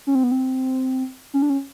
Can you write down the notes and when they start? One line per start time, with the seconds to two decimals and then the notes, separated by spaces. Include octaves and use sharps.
0.07 C#4
0.15 C4
0.23 B3
0.31 C4
1.34 C#4
1.42 D4
1.50 C#4